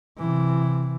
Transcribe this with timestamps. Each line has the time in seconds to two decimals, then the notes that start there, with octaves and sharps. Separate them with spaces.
0.19 C3 E3